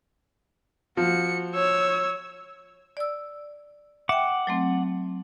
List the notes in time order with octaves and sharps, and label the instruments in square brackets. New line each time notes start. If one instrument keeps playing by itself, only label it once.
[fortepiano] F3 [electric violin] F#4 C#7
[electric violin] C#5 E6
[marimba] D5 E6
[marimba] E5 G5 [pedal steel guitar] F#5 D6
[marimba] F#3 A3 C4